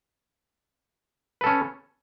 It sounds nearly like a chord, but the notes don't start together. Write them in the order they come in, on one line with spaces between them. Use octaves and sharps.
B4 A4 C#4